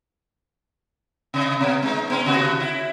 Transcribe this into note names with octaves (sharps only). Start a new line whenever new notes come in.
C3 D#5
B2 B3
G#3 D#4
G#2 B3 C#4
D#2 C3 F#4
E4